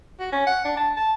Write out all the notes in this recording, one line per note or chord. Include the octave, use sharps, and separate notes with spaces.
F#4
C#4
F#5
D4
A5
A5